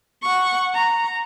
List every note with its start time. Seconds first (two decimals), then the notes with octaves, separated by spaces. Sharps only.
0.23 F#5 C#6
0.75 A#5